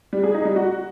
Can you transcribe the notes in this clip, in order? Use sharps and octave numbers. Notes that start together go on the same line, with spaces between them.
G3
G#4
D#4
G3
F#4